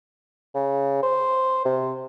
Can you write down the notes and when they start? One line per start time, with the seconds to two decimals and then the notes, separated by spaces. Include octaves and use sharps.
0.55 C#3
1.03 C5
1.65 C3